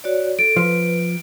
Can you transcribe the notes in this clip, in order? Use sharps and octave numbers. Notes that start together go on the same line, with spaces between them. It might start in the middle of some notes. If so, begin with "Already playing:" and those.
F#4 C#5 D5
A4 D7
F3 B4